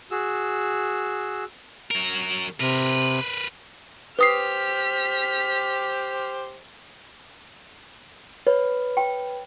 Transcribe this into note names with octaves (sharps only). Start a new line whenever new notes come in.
F#4 G#4 E6
F#3 A#4
C3 A#4 B4
G4 B4 C5 D#6 F6 B6 C7
B4 C#5
G5